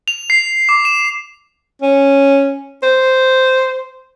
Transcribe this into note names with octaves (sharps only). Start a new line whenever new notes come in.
F7
C7
D6
E7
C#4
C5